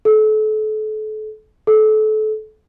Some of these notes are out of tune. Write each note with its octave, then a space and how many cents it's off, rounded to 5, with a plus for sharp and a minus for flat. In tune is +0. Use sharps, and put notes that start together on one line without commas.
A4 -35
A4 -30